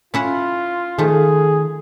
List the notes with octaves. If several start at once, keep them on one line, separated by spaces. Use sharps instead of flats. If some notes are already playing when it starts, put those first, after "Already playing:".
C#4 E4 F4 F#5
D#3 F3 A3 G#4